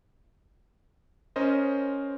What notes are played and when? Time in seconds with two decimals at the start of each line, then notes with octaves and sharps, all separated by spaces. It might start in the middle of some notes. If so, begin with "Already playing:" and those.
1.36 C#4 A#4 C5 D#5